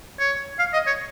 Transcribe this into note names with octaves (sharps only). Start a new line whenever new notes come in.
C#5
F5
D#5
C#5